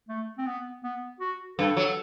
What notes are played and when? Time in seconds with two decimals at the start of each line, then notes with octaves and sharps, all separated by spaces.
0.09 A3
0.38 C4
0.47 B3
0.84 B3
1.20 F#4
1.58 G2 A4
1.77 F#3